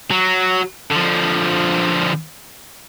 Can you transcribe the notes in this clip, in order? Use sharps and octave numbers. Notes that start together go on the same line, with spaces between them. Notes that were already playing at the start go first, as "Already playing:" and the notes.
F#3
D3 F3